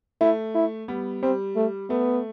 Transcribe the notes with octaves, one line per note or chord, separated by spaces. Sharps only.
A3 E4
E4
G3 B3
G3 C4
A3
A3 B3